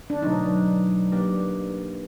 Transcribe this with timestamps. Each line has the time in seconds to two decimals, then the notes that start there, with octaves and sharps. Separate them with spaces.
0.10 D4
0.22 B2 F#3 A3 C4 D#4
1.11 A#3 D4 G4 B4